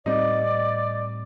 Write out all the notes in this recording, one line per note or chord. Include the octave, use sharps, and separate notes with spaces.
A2 G3 C4 D#4 D5